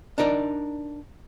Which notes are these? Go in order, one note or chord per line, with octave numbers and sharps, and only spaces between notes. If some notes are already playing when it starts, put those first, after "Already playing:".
D4 D#4 A#4 D5